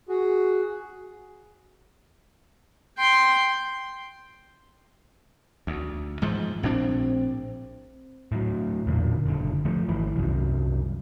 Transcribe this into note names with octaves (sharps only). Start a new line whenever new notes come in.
F#4 G#4
G5 C6
D2
G#2 E3 F3
A#1 A2 C4 D4
A2 F#3
E2 A#2 D3 A#3
F#1 D3
F3 A3
G#1 E3
C2 F#2